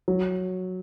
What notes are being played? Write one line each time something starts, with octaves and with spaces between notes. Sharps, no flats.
F#3